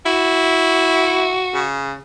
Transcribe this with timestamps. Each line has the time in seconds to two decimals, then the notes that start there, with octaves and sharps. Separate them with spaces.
0.06 E4 F#4
1.54 C#3